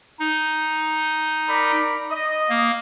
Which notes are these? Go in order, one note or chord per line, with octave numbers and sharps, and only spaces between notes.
D#4
A#4 D5 B5
D#5
A#3